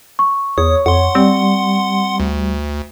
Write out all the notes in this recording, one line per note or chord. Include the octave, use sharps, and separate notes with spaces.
C#6
E2 C#5 D#6
F2 F#5 C6
G3 C4
D2